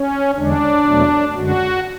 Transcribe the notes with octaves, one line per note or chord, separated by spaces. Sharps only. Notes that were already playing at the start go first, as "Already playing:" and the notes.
Already playing: C#4
E2 D3 G#3 D4
E2 B2 F#3 A3
F#2 D3 G#3 F#4